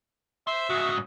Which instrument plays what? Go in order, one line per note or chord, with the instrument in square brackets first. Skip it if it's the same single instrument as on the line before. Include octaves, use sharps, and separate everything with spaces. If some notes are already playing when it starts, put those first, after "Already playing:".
[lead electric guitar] C5 C6 [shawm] E5
[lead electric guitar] G#2 C#3 [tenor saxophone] F#4